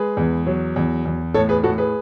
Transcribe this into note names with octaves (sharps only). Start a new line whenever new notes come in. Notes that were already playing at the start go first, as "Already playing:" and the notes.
Already playing: G#3 G#4 B4
E2
F#3
E2
E2
A2 A4 C#5
G#4 B4
A2 F#4 A4
G#4 B4